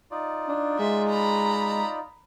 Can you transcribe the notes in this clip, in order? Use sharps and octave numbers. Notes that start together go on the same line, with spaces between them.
D#4 F4 D5
D4
G#3 E5
A#5 B5